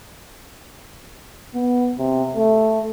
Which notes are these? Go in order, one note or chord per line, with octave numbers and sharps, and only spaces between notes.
B3
C3
A3